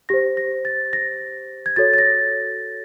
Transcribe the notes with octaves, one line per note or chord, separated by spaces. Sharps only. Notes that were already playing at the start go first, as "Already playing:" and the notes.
G4 C5 A#6
A#6
A6
A#6
G#6
F#4 A4 C#5 A6
A6
A#6